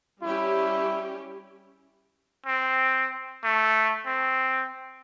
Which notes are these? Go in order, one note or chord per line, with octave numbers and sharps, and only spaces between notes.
G3 C#4 E4 G4
C4
A3
C4